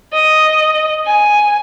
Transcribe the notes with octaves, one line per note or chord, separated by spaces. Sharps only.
D#5
G#5